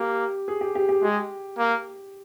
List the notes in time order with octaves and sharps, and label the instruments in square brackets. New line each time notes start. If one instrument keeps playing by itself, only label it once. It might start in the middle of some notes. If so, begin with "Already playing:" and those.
Already playing: [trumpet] A#3 [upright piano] G4
[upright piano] G#4
G4
G4
G4
[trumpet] G#3 [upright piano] G4
[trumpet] A#3